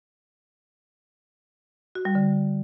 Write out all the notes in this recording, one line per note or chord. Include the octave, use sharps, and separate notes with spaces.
F#4
G3
D3